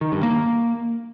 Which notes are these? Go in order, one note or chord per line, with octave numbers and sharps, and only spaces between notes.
D#3
G2
A#3